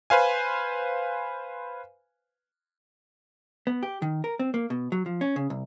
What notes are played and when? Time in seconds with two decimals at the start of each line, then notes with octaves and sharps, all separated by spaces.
0.10 B4 C5 F5 G#5
3.67 B3
3.83 G4
4.02 D#3
4.24 A#4
4.39 C4
4.54 A#3
4.70 B2
4.92 F#3
5.06 F3
5.21 C#4
5.36 C#3
5.50 C2